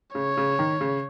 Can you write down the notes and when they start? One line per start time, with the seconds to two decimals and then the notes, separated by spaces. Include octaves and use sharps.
0.15 C#3 C#5
0.37 C#3
0.59 D#3
0.81 C#3